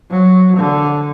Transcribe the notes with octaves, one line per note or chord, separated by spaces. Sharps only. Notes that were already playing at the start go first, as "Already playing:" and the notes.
F#3
D3